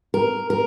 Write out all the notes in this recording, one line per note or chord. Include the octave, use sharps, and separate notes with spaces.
A#4
A#4